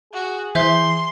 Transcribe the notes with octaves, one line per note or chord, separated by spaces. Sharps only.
F#4 G#4
E3 C5 E5 C6 G6